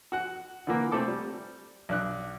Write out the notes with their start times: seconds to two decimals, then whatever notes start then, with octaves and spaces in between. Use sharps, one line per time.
0.12 F#4 F#5
0.67 D3 E3 A#3
0.91 A3 C4 A4 D6
1.08 G3
1.89 B1 D4 F#6